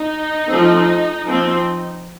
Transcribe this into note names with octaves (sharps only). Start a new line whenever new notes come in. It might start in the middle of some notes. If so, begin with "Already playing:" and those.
Already playing: D#4
F3 A3 C4
F3 C4